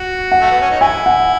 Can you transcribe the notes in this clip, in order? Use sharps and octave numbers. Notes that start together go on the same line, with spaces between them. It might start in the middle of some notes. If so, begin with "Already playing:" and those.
Already playing: F#4
F#5
A3
B3
C#4
D#4
E4 G#5
F#5